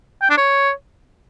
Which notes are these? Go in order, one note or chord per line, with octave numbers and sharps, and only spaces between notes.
G5
D4
C#5